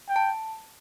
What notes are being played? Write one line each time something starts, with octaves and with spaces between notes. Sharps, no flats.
G5
A5